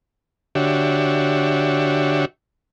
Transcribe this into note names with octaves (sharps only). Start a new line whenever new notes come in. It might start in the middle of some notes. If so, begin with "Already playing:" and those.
D3 D4 F#4 G4 C#5 E5